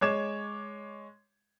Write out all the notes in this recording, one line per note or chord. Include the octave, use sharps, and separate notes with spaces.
G#3 C#5 D6 G#6 E7